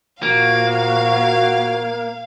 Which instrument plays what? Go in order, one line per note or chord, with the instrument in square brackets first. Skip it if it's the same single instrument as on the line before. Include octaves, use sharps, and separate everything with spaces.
[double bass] A#2 F3 [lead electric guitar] A#3 [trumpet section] F#4 [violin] F5